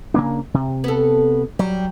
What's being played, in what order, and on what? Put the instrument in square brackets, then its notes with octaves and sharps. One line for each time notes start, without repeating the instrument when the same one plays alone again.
[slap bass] C#3 A#3 D4
C3
[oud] B3 A4
[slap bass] F#3 [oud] G3